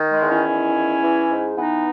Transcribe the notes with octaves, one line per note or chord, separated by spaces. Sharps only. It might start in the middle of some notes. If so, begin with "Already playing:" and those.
Already playing: D#3
G#3
E2
C#4 E4
D#3
E2
E3
G#2
E3 B3 D#4